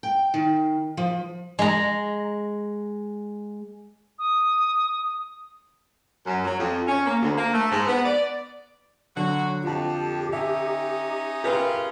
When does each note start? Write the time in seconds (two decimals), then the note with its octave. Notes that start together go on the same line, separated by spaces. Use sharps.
0.03 G5
0.34 D#3
0.97 F3
1.59 G#3 A#5
4.19 D#6
6.26 F#2
6.44 F#3
6.58 F2
6.87 C#4
7.05 A#3
7.22 D2
7.37 A#3
7.53 A3
7.72 G#2
7.87 B3
8.06 D5
9.17 D3 F#3 F#4
9.64 F2 F4 G4 A5
10.33 C#4 D#4 E5
11.44 C#4 F4 G4 G#4 A#4 B4